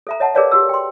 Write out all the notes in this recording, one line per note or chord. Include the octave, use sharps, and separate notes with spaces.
A4 E5 A#5
C#5 D#5 F#5 A5
G#4 A#4 B4 C#5 D5 F5
F#4 G4 E6
G5 C6